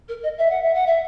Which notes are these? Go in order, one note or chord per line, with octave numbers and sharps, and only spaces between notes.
A#4
D#5
E5
F#5
E5
F#5
E5